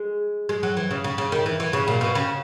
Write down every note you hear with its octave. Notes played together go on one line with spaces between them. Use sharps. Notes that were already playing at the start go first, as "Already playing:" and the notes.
Already playing: G#3
G#3
F#3
E3
C#3
C#3
C#3
D#3
E3
E3
C#3
A#2
B2
C#3